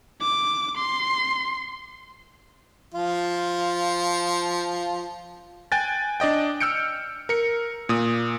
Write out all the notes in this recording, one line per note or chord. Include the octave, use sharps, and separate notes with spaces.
D6
C6
F3 F4
G5 G#5 F#6 A6
D4 D5 D#5 G5
E6 F6 G6 C#7 D7
A#4 C#7
A#2 D#6